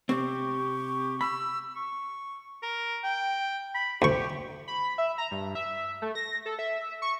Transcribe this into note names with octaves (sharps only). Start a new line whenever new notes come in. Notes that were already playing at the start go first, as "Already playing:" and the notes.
C3 C4 G4 C#6
B5 E6
C#6
A#4
G5
B5
D2 G4 C#6
B5
E5
A#5
G2
E5
A3
A#6
A4
E5
C#6